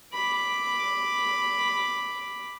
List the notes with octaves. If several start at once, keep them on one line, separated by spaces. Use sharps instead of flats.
B5 D6